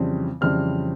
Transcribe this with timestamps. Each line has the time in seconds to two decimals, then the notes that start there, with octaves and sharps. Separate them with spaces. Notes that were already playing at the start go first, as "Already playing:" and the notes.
Already playing: F2 C#3 E3 G3 C4
0.41 F2 C#3 E3 G3 C4 F6